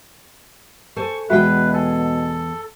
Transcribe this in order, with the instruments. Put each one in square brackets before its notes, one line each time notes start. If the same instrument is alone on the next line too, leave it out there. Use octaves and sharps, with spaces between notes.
[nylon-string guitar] A4 C5 G#5 [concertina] C#6
[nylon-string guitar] E2 G#3 G5 [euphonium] B2 [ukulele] F#4 E5 F#5 [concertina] B4
[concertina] A4 [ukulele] G#5